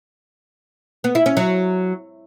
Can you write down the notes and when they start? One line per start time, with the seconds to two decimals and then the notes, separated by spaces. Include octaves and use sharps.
1.04 B3
1.15 E4
1.26 C#4
1.37 F#3